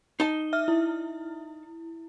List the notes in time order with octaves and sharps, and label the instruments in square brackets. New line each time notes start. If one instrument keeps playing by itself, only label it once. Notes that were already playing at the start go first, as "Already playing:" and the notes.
[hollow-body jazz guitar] D#4 A5 [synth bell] G7
[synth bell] E5 F6
E4